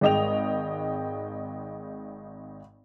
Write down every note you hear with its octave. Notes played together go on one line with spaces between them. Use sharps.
G#1 G#3 D#5 G5 F7